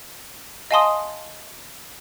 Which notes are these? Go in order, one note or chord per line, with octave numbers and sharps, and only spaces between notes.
D#5 F5 G#5 A5 C6 D#6